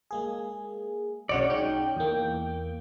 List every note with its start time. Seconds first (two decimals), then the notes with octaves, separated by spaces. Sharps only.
0.11 G#3 A#3 G#4
1.29 B1 C#4 F#4 C#5 D5 F#5
1.50 G#3 D#4 G5
1.96 E2 A#3